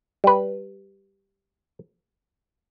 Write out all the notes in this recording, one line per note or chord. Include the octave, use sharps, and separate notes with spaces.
G3 B4